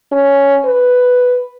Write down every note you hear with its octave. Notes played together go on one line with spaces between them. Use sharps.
C#4
B4